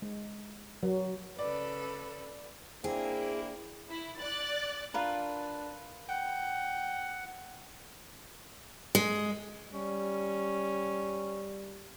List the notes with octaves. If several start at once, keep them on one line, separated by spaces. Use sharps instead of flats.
G#3
F#3
C#3 A4 B4 D5
A#3 C4 D4 E4 G#4
E4
D5 F#6 A6
D4 F4 A#4 B4
F#5 G5
G#3
G3 C#4